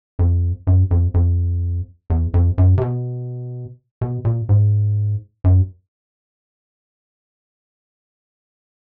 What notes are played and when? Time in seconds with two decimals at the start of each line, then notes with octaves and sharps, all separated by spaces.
0.19 F2
0.67 F#2
0.91 F2
1.14 F2
2.10 E2
2.34 F2
2.58 F#2
2.78 C3
2.81 B2
4.01 B2
4.25 A#2
4.49 G#2
5.44 F#2